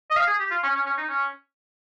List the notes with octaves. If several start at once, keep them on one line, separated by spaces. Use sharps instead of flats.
D#5
F5
G#4
G4
F4
C#4
C#4
C#4
D#4
C#4